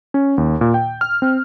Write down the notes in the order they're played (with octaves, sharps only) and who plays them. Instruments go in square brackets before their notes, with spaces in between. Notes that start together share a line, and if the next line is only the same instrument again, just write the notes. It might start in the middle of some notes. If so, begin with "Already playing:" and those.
[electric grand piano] C#4
D#2
A#2
G5
F6
C4